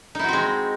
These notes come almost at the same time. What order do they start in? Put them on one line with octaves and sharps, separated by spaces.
D#4 E4 F#4 C4 G#3